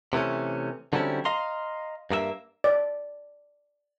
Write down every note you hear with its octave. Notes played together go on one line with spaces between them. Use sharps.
C3 E3 A3 C#4
D3 F#3 G3 C4 C#4 E4
D#5 F5 A#5 C6
G2 A#3 G#4 E5
D5